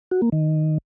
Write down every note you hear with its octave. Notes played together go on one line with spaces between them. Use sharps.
F#4
A#3
D#3